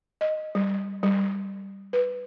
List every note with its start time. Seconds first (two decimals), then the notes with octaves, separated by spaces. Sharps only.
0.21 D#5
0.55 G3
1.03 G3
1.93 B4